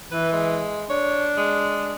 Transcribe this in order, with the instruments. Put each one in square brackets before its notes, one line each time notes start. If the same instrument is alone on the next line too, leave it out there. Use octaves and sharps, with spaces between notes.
[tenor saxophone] E3 [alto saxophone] B4
[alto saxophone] G#3
[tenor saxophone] D4 [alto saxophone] C#5
[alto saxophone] G#3